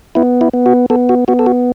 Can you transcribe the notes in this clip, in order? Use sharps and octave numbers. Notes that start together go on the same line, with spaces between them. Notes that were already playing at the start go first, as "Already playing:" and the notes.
B3 E4
E4
B3
F#4
B3 A4
F#4
B3 F#4
A4
F#4